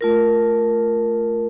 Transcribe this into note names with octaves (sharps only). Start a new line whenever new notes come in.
A3 F4 A#4